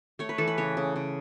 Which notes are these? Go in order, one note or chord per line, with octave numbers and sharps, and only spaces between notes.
A3 C#5
B4
E3 A4
B4
C#3 C#5
C#3
C#3